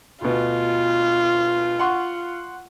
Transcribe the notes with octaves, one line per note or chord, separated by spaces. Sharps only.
D2 B2 F4
F#5 C6 C#6